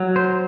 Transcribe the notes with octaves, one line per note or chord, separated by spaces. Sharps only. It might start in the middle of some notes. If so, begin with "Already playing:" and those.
Already playing: F#3
C5